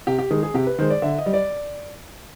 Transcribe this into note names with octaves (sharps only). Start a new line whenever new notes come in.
C3 G4
G4
D#3 G#3 G#4
G#4
C3 G4
B4
D#3 G#3 C5
D5
D3 E5
D#5
G3
D5